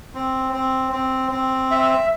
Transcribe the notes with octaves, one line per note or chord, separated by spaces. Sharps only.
C4
C4
C4
C4
E5